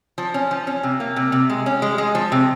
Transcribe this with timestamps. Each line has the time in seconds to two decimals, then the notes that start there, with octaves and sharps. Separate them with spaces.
0.18 F3
0.34 C#4
0.51 F3
0.67 C#4
0.83 C3
1.00 A#3
1.16 C3
1.32 C3
1.50 G#3
1.66 C#4
1.82 G#3
1.98 G#3
2.15 F3
2.32 C3